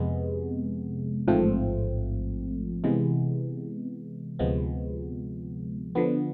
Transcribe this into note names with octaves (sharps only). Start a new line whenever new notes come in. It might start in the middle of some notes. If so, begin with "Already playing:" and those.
Already playing: F2 C3 G#3 B3
A1 G#2 F3 A3 C4
C3 E3 G#3 B3
D2 C3 F3 G#3 B3
D3 F3 B3